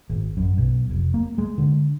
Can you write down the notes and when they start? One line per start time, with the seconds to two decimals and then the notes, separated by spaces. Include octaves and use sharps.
0.10 G#1
0.37 F#2
0.58 B1
0.90 F1
1.14 A#3
1.38 G#3
1.58 D3